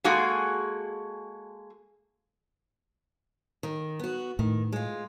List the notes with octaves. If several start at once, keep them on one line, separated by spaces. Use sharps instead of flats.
G#3 A#3 F#4 G#4 A4
D#3
B3 F#4
A2 D#3
G#3 F4